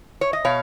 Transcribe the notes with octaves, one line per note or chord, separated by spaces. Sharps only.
C#5
D#5
B2 C#5 F5